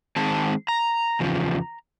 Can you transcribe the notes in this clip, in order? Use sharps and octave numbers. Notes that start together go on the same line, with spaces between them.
D#3 G#3 C4 A5
A#5
E2 C#3 F3